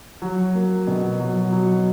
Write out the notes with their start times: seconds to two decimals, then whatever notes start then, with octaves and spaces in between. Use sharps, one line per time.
0.22 F#3
0.55 A#3
0.87 B2
1.19 F#3
1.52 F#3